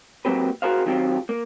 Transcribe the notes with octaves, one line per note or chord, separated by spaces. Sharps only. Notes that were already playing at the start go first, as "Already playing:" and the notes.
F#3 A#3 C4 G4 B4
F#4 G#4 A#4 C5 F5
D#3 F#3 C4 F4 G4
A#3